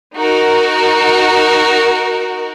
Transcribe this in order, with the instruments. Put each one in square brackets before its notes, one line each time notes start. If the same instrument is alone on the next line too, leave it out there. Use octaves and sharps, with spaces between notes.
[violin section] D#4 F#4 A#4